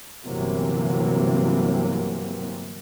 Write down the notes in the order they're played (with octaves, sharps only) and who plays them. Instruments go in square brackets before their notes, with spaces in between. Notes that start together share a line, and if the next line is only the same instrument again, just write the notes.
[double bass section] G1 C3 E3 F#3 A#3 C4